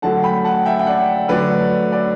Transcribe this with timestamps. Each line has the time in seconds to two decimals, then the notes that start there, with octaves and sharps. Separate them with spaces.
0.02 D3 F#3 A3 F#5 A5
0.23 G5 B5
0.44 F#5 A5
0.66 E5 G5
0.79 G5
0.86 D5 F#5
1.28 D3 F#3 A3 B4 D5
1.92 B4 D5